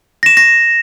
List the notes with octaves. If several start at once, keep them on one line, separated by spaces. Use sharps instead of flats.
A#6 E7
A#6